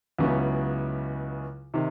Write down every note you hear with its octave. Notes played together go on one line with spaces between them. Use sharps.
C#2 C#3 F#3 B3 E4
C3 D#3